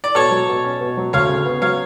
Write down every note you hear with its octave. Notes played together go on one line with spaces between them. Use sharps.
D5
B2 A4 C#5
F#3
B2
C#4
B2
F#3
D2 C#5 F5
C#3
B3
F#3 C#5 F5